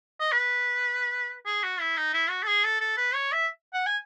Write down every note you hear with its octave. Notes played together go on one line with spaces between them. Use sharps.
D#5
B4
G#4
F#4
E4
D#4
E4
F#4
A4
G#4
A4
A4
B4
C#5
E5
F#5
G#5